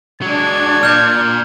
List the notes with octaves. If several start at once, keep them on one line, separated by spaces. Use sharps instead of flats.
F#3 G#3 D4 G#6
A#2 F6 G6